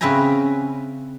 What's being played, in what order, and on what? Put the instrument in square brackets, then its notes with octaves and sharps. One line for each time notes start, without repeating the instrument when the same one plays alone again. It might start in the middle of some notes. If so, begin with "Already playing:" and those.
[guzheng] C#3 C4 B4 E5 G#5 A#5